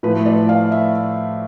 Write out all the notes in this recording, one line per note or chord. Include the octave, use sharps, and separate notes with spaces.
A2 F3 A3 B4
D5
F5
E5